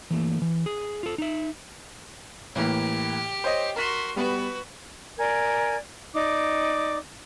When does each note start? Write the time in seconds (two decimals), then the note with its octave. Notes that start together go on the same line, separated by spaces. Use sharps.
0.10 E3 A3 A#3
0.42 E3
0.66 G#4
1.03 F4 A4
1.18 D#4 E5
2.56 A2 E3 A#3 G4
3.44 C5 C#5 D#5
3.76 F#4 A#4 C6 B6 E7
4.16 G3 B3 F#4 B4
5.17 A#4 D5 G#5 G#6
6.13 D#4 D5 D6